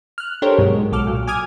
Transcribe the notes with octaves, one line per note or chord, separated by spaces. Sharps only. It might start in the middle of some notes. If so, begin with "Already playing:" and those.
F6 F#6
D4 G4 A4 A#4 C5 C#5
G#2 B2 F#3 G#3
B1 B2 A4 D6 F6
A#2 F#3
G#5 D6 D#6 F6 G#6